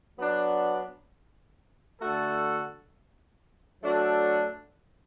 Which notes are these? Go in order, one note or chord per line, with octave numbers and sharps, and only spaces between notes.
F#3 B3 D4
D3 A3 F#4 A4
F#3 A3 D4 F#4 A4